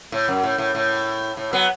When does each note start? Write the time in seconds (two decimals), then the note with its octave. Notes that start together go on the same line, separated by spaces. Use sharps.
0.12 A2
0.28 F#2
0.43 A2
0.58 A2
0.75 A2
1.37 A2
1.53 F#3 B3